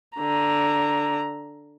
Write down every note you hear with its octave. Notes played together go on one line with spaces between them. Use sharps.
D3 A#5